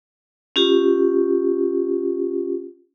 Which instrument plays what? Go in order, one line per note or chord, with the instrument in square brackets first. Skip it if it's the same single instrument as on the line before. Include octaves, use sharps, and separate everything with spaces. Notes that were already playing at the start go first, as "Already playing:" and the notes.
[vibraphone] C#4 F4 G4